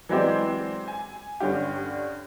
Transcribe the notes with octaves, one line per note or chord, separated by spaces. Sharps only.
E3 F#3 G#3 C4 G4 D5
G#5
G2 D3 C#4 G4